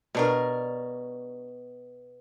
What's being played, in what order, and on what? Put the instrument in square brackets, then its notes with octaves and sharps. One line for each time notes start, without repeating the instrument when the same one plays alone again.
[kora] B2 C#5 D5 [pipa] G3 D4 A#4